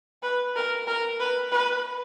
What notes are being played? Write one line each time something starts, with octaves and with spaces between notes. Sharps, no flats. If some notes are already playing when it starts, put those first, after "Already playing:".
B4
A#4
A#4
B4
B4